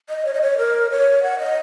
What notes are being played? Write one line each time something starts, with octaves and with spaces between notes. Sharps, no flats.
D#5
C#5
D#5
C#5
A#4
C#5
F#5
D#5